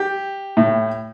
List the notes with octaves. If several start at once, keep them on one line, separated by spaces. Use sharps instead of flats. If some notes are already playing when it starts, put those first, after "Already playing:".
Already playing: G4
A2